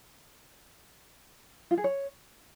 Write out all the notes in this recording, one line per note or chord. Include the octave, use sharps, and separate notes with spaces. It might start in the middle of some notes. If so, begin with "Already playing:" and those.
F4
G#4
C#5